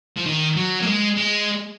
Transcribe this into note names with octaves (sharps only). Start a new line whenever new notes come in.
F3
D#3
F#3
A#3
G#3
G#3